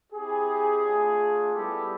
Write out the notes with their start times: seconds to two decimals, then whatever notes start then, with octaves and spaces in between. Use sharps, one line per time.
0.13 C4 E4 G4 G#4
0.84 A3 D4 F4
1.54 G3 B3 E4 G4 A4